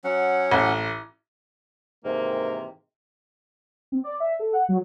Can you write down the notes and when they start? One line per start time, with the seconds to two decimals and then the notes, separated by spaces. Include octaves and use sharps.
0.04 F#3 C#4 F#5
0.52 A1
2.04 G#2 C3 D#3 E3 A#3
3.92 C4
4.04 D5
4.20 E5
4.39 A4
4.53 F#5
4.69 F#3